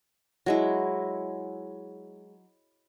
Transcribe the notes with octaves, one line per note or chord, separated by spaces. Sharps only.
F#3 G#3 E4